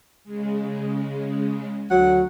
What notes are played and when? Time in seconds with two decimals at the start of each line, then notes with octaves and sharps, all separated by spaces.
0.24 C#3 G#3
1.91 D2 F#3 F#5